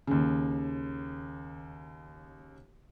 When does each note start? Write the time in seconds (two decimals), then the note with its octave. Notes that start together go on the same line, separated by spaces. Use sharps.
0.07 D#2 C#3